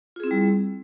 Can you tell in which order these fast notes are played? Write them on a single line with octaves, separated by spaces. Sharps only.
F4 G#4 C4 E4 G3